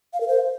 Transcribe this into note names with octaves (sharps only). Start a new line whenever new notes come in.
F5
A#4
C5